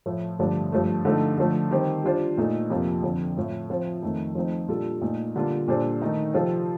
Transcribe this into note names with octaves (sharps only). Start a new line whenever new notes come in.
A2 F3 A3
G2 D3 F3 A3 D4
G2 F3 A3
D3 F3 A3 D#4 A4
D3 F3 A3
D#3 G3 C4 G4 C5
G3 D4 F4 C5
A#2 A3 D#4 A4
F2 C3 F3 A#3 F4
F2 D3 F3
A2 F3 A3
F3 C4 F4 C5
F2 D#3 A3
F3 A3 C4 D#4
A#2 G3 D4 F4 A4
A#2 A3 D#4
D3 G3 A#3 D4 F4
A#2 G3 D4 A4 C5
D#3 A3 D#4
C3 F3 C4 F4 A4